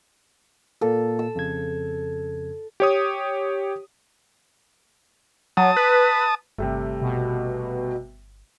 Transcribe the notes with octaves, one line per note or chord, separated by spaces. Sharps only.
A#2 A#3 A4
E6
F2 C#3 G#6
G4 C#5 D#6
F#3 A5 D#6
B4
G1 C3 G3 A3
B2